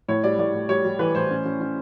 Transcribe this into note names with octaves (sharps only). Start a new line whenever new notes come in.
A2 C#5
G3 D5
A2 D5
A2
G3 C#5
G3
E3 B4
A2 C5
C#4
C#4
C#4